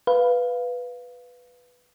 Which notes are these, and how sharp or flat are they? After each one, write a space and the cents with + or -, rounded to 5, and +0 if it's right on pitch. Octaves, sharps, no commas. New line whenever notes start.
B4 +0 F5 +0